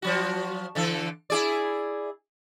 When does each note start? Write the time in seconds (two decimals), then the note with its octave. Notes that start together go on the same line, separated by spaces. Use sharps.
0.02 F3 F#3 F#4
0.75 D3 E3 A4
1.30 E4 G#4 D5